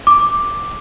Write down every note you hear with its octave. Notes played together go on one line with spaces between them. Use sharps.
D6